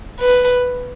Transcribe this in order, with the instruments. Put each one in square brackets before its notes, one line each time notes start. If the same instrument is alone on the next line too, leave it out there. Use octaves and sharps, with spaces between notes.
[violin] B4